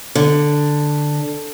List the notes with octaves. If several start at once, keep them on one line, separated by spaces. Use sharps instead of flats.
D3